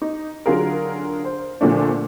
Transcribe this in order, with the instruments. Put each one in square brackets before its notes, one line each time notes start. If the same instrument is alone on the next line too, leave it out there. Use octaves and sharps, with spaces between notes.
[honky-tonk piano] D#4
D3 F#3 F4 G#4 A#4
C5
A#2 D3 F3 A3 D4